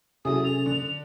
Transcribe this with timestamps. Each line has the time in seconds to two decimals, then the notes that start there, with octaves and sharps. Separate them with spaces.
0.25 C3 F#3 C#4 E4 G#4 A4 D#6
0.44 G#4 F7
0.66 D3